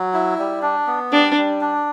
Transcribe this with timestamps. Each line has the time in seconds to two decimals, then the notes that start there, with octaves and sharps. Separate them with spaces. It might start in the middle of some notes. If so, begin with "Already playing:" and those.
Already playing: F#3
0.14 E4
0.39 G3
0.62 D4
0.87 B3
1.12 G3 D4
1.37 G3
1.61 D4